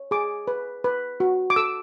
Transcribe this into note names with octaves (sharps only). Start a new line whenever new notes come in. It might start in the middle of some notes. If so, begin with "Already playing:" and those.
Already playing: C#5
G#4 D6
B4
B4
F#4
D6
A4 E6